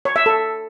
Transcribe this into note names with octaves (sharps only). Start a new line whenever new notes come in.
C#5
E5
A4